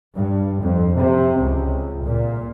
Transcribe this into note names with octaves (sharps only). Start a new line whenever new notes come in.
G2
F2
C3
C#2
A#2